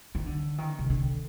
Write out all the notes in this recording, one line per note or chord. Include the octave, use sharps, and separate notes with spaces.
D#3
D3
D#3
C3
D3